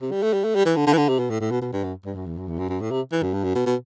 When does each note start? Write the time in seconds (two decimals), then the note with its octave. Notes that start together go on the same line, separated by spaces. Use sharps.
0.02 C3
0.12 G3
0.23 A3
0.33 G3
0.44 A3
0.55 G3
0.66 E3
0.77 D3
0.87 D3
0.93 E3
0.97 D3
1.09 C3
1.19 B2
1.30 A2
1.40 A2
1.51 B2
1.62 B2
1.73 G2
1.84 F#2
2.05 G2
2.16 F#2
2.27 E2
2.38 F#2
2.48 E2
2.59 F#2
2.69 F#2
2.81 A2
2.91 C3
3.12 E3
3.23 F#2
3.34 G2
3.44 F#2
3.55 B2
3.66 B2